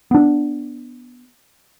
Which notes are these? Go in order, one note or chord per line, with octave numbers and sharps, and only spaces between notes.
B3 D4